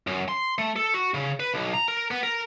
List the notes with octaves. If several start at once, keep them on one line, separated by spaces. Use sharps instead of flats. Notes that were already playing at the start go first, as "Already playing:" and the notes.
F#2
C6
A3
A4
F#4
C#3
B4
B1
A#5
A#4
B3
A#4